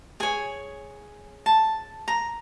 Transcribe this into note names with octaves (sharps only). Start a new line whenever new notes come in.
G#4 C#5 G#5
A5
A#5